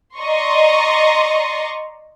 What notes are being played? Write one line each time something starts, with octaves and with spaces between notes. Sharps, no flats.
D5 D#5 A#5 C6 C#6